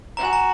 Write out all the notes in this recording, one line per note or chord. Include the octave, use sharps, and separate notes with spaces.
F#4 A#5
G#5
A#5